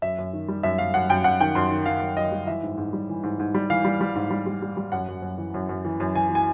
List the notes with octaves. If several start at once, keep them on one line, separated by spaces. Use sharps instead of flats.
F#2 E5
F#2
D#3
G3
F#2 E5
F#2 F5
F#2 F#5
F#2 G5
F#2 F#5
D#3 G5
F#2 C6
D#3
D#3 F5
F#2
F#2 D#5
G3
E3 E5
G#2
G#2
G3
E3
G#2
G#2
G3
E3 F5
G3
G3
G#2
G3
G3
G3
G3
F#2 F#5
F#2
F#2
E3
F#2
F#2
E3
F#2
E3 G#5
E3
G#5